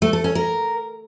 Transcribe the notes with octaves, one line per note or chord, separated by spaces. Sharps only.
A3
A4
C#4
A#4